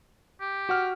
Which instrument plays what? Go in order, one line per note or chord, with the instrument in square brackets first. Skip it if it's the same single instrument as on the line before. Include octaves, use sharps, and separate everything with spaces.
[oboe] G4
[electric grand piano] F#4 F#5 F6